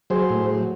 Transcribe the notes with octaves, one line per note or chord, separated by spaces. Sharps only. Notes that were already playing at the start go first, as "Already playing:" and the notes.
F#3 G#4 C5
A2
F#3